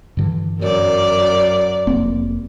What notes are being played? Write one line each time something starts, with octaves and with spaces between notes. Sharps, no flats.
G2 D3 E3
F#2 A#4 D5
F1 A#3 C4